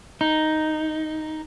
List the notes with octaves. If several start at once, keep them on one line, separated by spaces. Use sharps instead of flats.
D#4